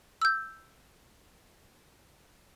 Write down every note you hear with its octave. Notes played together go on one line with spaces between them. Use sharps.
E6 G6